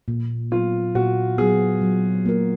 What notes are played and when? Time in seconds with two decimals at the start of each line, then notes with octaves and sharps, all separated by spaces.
0.08 A#2
0.51 F#3 B3 F4
0.95 A#2 F#4
1.38 F#3 B3 G#4
1.82 F#3
2.26 A#3 F4 A#4